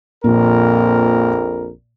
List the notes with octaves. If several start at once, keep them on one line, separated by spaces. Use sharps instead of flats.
A#1 F2 A#2 A#4